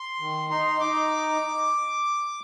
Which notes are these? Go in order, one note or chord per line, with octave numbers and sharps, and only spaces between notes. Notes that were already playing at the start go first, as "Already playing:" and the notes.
Already playing: C6
D#3
D#4 C6
D#4 D6